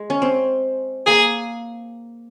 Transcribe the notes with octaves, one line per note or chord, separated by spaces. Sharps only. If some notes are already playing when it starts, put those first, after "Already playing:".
Already playing: G#3
C#4
C4
A#3 G#4